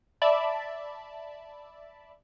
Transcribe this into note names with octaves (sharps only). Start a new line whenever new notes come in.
D5 E5 A5 B5